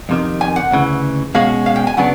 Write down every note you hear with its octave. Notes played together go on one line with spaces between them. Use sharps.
F2 C3 D#3
G#5
F#5
D2 C#3 E3
B2 G#3 C#4 F#4 F5
F5
G5
G#5
C#3 F#3 B3 D4 F#5